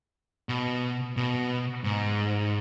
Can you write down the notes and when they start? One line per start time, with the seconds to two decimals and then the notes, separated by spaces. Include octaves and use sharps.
0.49 B2
1.17 B2
1.84 G#2